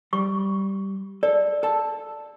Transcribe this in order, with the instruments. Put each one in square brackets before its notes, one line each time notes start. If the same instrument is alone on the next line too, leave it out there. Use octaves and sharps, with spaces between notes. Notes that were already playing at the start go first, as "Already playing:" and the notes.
[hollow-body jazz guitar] G3 [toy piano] C#6
[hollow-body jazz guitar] A4 [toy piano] D5
[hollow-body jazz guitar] A4 A5